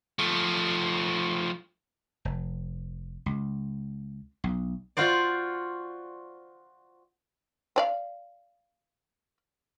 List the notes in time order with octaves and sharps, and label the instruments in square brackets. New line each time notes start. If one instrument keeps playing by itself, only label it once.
[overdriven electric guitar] F3 A3
[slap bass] F1
C#2
B1
[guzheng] F4 F#4 C5 D5
[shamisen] C4 D5 F5